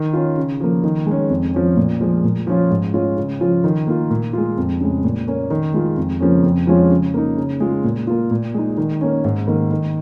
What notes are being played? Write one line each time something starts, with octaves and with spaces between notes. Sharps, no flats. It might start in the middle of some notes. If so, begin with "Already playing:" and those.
Already playing: D#3
C#4 F4
C#3
F3 A#3
D#3
G#3 C#4
F2
F3 C#4
A#2
F3 G#3
A#2
F3 C#4 F4
G#2
G#3 C#4 F4
C#3
F3 C#4 F4
D#3
A#3 F4
A#2
G#3 F4
F2
C#3 G#3
A#2
A#3 C#4
D#3
G#3 F4
F2
C#3 F3 A#3 C#4
F2
F3 G#3 C#4 F4
C#3
A#3 D#4
C#3
G#3 F4
A#2
A#3 F4
A#2
G#3 D#4
D#3
A#3 C#4
G#2
D#3 A#3
D#3